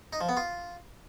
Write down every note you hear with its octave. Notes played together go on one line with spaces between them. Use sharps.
D#4
F3
B3
F4